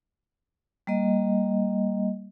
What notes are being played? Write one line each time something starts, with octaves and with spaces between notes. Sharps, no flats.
G3 A#3 D#5